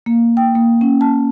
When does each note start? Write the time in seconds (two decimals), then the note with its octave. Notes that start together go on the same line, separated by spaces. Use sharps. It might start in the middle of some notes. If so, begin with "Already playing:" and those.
0.06 A#3
0.37 G5
0.55 A#3
0.81 C#4
1.01 A5